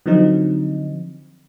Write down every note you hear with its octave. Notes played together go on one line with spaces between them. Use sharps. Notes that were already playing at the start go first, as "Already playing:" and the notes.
D3 F3 F#3 C4 D#4